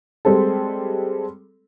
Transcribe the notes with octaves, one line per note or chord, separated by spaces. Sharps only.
G3 G#3 C4 A4